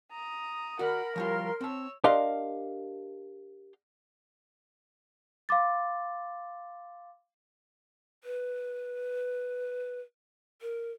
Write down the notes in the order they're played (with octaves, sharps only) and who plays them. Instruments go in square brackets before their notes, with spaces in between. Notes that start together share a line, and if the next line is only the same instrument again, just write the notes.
[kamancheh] A#5 D#6
[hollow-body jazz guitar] F#4 D5 [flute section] A#4 [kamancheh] F#5 B5
[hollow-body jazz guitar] F3 G3 F4 [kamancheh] C#5 C6
[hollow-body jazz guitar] C4 A5 [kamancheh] C#5 E6
[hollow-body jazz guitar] D4 G4 A#4 D#5 F5 C6
[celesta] F5 C6 D6 A6
[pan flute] B4
A#4